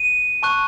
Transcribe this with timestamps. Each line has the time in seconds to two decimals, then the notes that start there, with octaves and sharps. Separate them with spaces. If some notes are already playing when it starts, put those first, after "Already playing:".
Already playing: D#7
0.43 A5 C#6 F#6